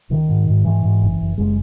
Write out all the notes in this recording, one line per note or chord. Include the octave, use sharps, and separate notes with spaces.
C#2 D#3
G#2
G#2
G#2 E3
G#2
F#1
F#1
F#1 G#3